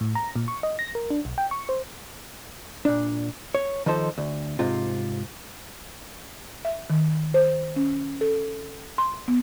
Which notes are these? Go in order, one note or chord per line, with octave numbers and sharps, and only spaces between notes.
A2
A#5
A#2
C#6
D#5
A#6
A#4
D4
B1
G5
C#6
C5
A#2 D4
C#5
D#3 F3 D#4 A4 C5
D2
G#2 C3 F4
E5
D#3
C5
C#4
A4
C6
B3